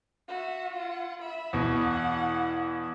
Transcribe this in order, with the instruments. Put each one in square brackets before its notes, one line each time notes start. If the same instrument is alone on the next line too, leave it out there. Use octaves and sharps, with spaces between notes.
[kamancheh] F#4 E5
F4 F#5
E5 B5
[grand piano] E2 B2 [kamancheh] F#5